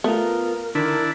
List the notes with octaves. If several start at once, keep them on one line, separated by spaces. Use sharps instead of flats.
A3 B3 F4 A#4
D3 D#3 D4 E4 A#4